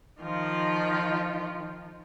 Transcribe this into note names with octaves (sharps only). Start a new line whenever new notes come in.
D#3 F3 F4